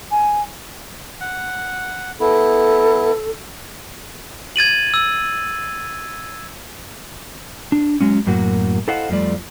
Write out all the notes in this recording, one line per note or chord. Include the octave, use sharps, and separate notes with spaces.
G#5
F#5
B3 E4 A4
G#6 A6 D#7 F#7
E6
D4
F#3 G#3 C#4
F#2 A2 F#3 A#3 F#4
E4 A4 C5 D#5 F5 F#5
F2 F3 G3 A3 D5